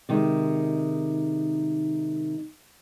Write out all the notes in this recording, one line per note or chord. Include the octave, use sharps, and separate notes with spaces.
C3 D#3 G#3 D#4